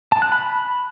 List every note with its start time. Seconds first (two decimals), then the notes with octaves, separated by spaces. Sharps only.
0.12 A5
0.22 F#6
0.32 B5